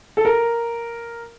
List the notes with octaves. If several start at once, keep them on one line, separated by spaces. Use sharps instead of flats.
A4
A#4